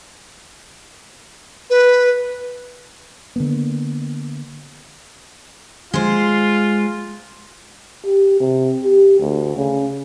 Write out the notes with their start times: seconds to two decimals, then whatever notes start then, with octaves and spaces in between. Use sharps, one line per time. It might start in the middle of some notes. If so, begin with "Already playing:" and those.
1.70 B4
3.36 D3 A#3 B3
5.94 G#3 F4 C5
8.05 G4
8.40 C3
8.84 G4
9.20 D2
9.57 C#3